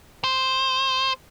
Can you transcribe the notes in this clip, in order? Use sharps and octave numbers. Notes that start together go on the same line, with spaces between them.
C5